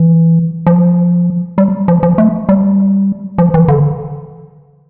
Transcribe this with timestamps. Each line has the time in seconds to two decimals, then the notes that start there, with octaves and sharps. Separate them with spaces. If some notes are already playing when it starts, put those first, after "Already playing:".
Already playing: E3
0.67 F3
1.58 G3
1.88 F3
2.03 F3
2.18 A3
2.49 G3
3.38 F3
3.54 E3
3.68 D3